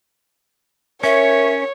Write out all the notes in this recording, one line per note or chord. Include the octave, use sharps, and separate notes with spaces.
C#4 A#4 C#5 E5